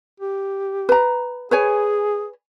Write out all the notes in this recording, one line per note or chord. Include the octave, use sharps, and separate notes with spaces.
G4
B4 A#5
G#4 B4 C#5 G#5